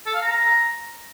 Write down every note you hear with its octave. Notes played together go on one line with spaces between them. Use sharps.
A4
F5
A#5